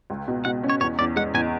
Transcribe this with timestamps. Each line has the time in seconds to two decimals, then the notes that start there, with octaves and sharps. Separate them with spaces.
0.10 C#2
0.28 B2
0.45 B2 F#5
0.63 C#4
0.70 C#5
0.81 E2 C#5
0.99 E2 D5
1.16 G#3 F#5
1.34 E2 G#5